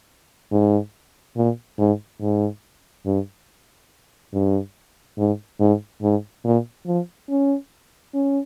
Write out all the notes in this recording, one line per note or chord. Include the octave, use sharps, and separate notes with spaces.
G#2
A#2
G#2
G#2
G2
G2
G#2
G#2
G#2
A#2
F3
C#4
C#4